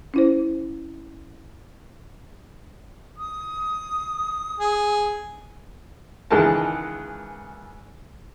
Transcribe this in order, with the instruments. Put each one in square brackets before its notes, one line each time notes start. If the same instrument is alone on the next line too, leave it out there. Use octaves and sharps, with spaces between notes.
[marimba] C#4 E4 C5
[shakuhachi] D#6
[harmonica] G#4
[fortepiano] C#2 D#3 E3 G#3 A#4 A5